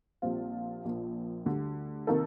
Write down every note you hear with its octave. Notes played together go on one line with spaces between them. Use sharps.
A#1 A#2 G3 C4 F4
A#1 A#2 F3
D2 D3 G3
C3 D#3 A#3 D#4 A4